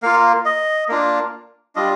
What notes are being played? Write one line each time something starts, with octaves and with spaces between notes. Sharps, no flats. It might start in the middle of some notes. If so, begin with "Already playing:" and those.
A#3 F4 F5
D#5
A#3 D4 F4
G3 D4 F4 D#5